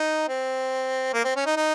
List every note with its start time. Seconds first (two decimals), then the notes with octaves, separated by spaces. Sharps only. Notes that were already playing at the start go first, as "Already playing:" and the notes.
Already playing: D#4
0.28 C4
1.14 A#3
1.25 C4
1.36 C#4
1.46 D#4
1.57 D#4